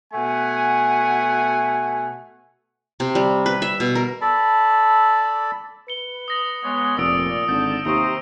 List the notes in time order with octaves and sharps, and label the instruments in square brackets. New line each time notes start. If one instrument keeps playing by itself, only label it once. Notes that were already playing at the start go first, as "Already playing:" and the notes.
[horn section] B2 A3 F#5 G#5
[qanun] C3
G3
B4
E5
B2
A#4
[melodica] A4 D5 A5 B5
[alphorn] B4 [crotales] C#7 G7
[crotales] D#6 A#6 F#7
[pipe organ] G#3 B3 C#5
[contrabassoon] F1 [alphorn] A#2 [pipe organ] D5 [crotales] D#6 E6 D7
[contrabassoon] G#1 [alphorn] D3 [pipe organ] A5 G6
[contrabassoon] D#2 [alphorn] C3 [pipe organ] C5 A#5 [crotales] C#6 D#6 D7